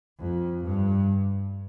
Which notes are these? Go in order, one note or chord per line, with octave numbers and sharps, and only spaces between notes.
F2
G2